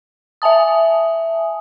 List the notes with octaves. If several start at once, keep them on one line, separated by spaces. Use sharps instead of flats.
E5 G#5 A5 D#6